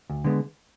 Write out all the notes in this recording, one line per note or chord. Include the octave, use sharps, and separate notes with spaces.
D2
D3 G#3 B3